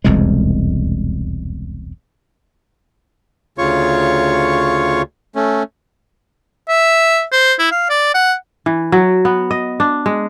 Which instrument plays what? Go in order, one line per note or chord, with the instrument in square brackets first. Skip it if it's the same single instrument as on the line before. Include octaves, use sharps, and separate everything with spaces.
[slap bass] E1 C2 F2 G#3
[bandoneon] D2 C#3 F4 C#5 C#6
A3 C#4
[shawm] E5
C5
E4
F5
D5
F#5
[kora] E3
F#3
B3
D#5
D4
G#3